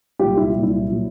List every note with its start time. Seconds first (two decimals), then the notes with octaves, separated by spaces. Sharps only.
0.19 C2 A#2 F#3 F4 G4
0.37 E4
0.50 F4
0.55 C2 A#2 F#3
0.63 E4
0.91 A#2 F#3